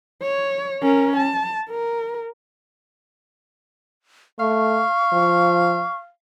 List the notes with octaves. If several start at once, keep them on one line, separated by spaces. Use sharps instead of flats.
C#5
C#4 A#4
A5
A#4
A3 F5 C#6
F3